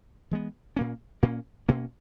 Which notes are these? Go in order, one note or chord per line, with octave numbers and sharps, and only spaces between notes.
E3 G#3 B3
A#2 A#3 C#4
A#2 A#3 C#4
B2 A#3 C#4